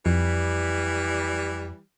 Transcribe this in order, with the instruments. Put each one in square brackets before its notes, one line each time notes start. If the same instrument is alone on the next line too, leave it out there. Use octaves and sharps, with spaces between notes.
[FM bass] F2 [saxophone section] E3 G3